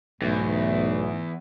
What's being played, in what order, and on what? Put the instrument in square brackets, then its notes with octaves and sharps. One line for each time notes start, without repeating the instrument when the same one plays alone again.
[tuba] B1 [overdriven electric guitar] E2 [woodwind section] G#2 A3